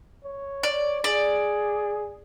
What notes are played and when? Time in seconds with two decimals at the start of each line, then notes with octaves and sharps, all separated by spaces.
0.24 C#5
0.63 D5
1.04 G#4 D5